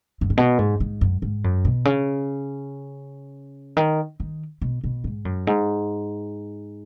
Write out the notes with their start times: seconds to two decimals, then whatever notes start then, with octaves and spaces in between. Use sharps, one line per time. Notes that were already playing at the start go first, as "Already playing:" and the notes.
0.21 F#2
0.30 G#2
0.37 B2
0.59 G#2
0.80 G#2
1.01 F#2
1.22 G#2
1.44 F#2
1.65 B2
1.85 C#3
3.77 D#3
4.20 D#3
4.62 B2
4.84 B2
5.04 G#2
5.25 F#2
5.47 G#2